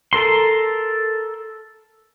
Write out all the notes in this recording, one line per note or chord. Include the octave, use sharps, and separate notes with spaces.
A4 A#4 C6